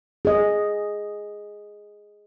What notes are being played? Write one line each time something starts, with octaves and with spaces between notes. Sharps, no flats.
G#4 D#5